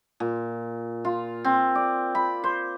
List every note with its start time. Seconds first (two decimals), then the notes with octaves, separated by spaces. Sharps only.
0.20 A#2
1.05 F4
1.45 C4
1.75 D5
2.15 B5
2.44 C5